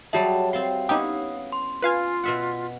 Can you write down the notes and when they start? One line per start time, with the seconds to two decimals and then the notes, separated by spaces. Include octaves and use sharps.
0.13 F#3 G3 F#4 G#4 E5 A5
0.53 C4 F5 A5 C6 C7
0.89 B3 C#4 D#4 E4 G4 D#6
1.52 C6
1.82 F4 B4 F5 G#5
2.23 B2 E5 F#5